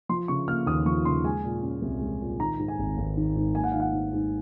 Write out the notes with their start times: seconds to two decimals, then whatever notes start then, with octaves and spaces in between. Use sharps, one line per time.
0.09 F3 C6
0.28 C#3 C#6
0.48 A#3 F6
0.66 D#2 D#6
0.86 F3 C#6
1.05 C#3 C6
1.25 G#3 G#5
1.44 A#2
1.62 C#4
1.82 C2
2.01 G#3
2.21 A#2
2.40 D#3 A#5
2.59 G#2
2.68 G#5
2.79 G#1
2.98 G#1
3.17 D#3
3.36 G#2
3.55 A#3 G#5
3.64 F#5
3.72 D#3 F5
3.80 F#5
3.93 G#2
4.13 G#2